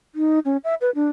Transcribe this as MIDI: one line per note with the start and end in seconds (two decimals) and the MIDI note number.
0.15 0.39 63
0.45 0.57 61
0.64 0.74 76
0.81 0.90 71
0.95 1.10 62